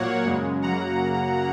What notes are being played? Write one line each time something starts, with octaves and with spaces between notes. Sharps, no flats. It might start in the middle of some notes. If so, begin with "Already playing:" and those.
Already playing: A#2 F#3 A#3 C#5 F#5
F#2 C#3 G#3
F#2 C#3 F#3 A#3 F#5 A#5